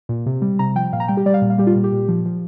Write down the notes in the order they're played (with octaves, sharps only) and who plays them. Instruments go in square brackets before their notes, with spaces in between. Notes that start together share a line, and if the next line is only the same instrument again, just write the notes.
[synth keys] A#2
C3
G3
C3 A#5
F3 G5
A#2 F5
A#5
G3 G5
G4
G3 D5
F5
A#2
F5
G3 G4
F4
A#2
G4
A#2
F3
F3